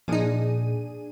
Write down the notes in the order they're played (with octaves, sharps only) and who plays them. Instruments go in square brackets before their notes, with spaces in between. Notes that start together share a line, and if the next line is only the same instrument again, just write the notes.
[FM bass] A#2 [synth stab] F3 D#4 [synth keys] D4 G#4 D#7